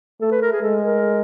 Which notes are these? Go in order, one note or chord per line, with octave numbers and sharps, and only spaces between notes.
A3 A4
B4
A#4
G#4
G#3 A4
A#4